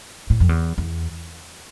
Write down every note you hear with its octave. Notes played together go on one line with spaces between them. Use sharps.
A2
F2
E2
E2